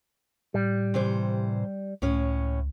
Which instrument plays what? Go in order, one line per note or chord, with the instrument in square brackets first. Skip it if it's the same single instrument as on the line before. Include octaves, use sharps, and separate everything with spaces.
[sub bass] A2 [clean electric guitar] G3
[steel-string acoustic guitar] C3 E3 C5
[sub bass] C#2 [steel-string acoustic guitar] A2 C#4